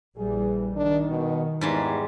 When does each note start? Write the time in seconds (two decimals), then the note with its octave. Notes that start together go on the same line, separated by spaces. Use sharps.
0.17 A#1 E3 G3 G#4
0.76 D#3 D4
1.09 B2
1.61 E2 G#2 G3 G#3